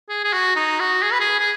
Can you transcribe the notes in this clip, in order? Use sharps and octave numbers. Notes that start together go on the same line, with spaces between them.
G#4
G#4
F#4
D#4
F#4
G#4
B4
G#4
G#4